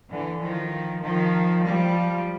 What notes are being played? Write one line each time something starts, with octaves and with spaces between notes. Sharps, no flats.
D3 E3
D#3 F3
D#3 F3
F3 G3